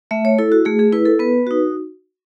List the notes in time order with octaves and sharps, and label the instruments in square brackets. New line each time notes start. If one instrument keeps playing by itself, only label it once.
[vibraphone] A3 E5
C#5
E4 A4
F#4
A3 G#4
G#4
E4 B4
A4
B3 B4
D#4 F#4